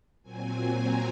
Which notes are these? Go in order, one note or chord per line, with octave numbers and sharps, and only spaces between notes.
A#2 F#3 C4 G#5
A#5